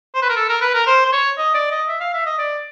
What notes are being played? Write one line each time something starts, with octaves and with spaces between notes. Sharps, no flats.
C5
B4
A#4
A4
A#4
B4
A#4
C5
C5
C#5
D#5
D5
D#5
E5
F5
E5
D#5
D5